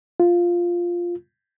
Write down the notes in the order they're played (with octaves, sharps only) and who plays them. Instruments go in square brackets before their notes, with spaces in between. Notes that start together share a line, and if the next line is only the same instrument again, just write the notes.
[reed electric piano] F4